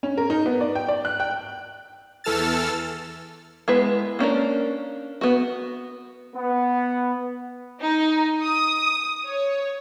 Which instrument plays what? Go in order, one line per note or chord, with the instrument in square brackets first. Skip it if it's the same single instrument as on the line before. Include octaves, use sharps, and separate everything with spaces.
[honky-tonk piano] C#4
A#4
D#4
B3
D5
G5
D5
F#6
G5
[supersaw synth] E2 E3 A4 E6 F6 A6
[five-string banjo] G#3 B3 E4 B4
A#3 C#4 D4 A#4
B3 F#4
[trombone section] B3
[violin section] D#4
D#6
C#5